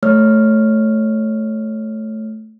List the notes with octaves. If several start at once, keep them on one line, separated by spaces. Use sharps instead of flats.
A3 C#5 F6